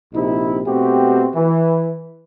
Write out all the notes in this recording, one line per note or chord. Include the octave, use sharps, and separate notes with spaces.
A#1 C3 D#4 E4
B2 A3 C4 F#4 G4
E3